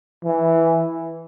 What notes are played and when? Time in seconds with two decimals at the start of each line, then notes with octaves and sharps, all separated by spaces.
0.24 E3